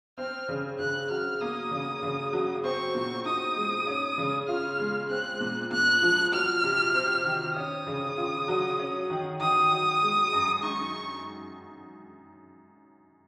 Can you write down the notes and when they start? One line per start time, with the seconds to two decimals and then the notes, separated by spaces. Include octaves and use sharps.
0.18 C4 F6
0.49 C#3
0.79 C#3 F#6
1.10 F#3 F6
1.41 A#3 D#6
1.71 C#3
2.03 C#3
2.33 F#3
2.64 C4 C#6
2.95 A#2
3.25 D#4 D#6
3.56 G#3
3.87 C#4
4.18 C#3
4.48 F4 F6
4.79 G#3
5.09 C4 F#6
5.40 A#2
5.71 A#2 F#6
6.02 F3
6.32 F#3 F6
6.64 C3
6.94 C4
7.25 D#3
7.55 C#4 D#6
7.87 C#3
8.17 F4
8.48 F#3
8.79 C#4
9.10 D#3
9.40 D#3 D#6
9.71 F#3
10.02 G#3
10.33 F#2
10.63 D#4 C#6